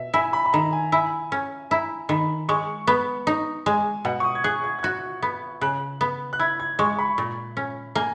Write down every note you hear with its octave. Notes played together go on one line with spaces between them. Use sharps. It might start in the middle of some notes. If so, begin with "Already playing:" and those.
Already playing: B2 E5
E4 G#5
B5
B5
D#3 A#5
G#5
E4 G#5
C#4
E4 A#5
D#3 B5
G#3 C#6
B3
D#4
G#3 G#5
B2 F#5
C#6
D#6
G#6
G#4 F#6
G#6
G#6
F#4 F#6
B3
C#3 F#6
B3
F#6
E4 G#6
G#6
G#3 C#6
B5
A#2
C#4
A#3 G#5